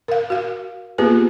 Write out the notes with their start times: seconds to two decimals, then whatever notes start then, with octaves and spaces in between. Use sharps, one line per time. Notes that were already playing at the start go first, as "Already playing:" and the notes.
0.08 A#4 F5
0.30 F#4 F5
0.98 A#3 B3 F4 G4 G#4 B4